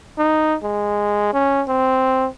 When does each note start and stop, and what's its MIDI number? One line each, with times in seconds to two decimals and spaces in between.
0.18 0.55 63
0.63 1.29 56
1.33 1.63 61
1.68 2.27 60